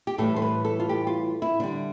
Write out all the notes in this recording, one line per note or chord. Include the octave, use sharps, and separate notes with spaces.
G4
A2 E3 G3 A4
C5
B4
A4
F4
G4
F4
E4
D3 G3 D4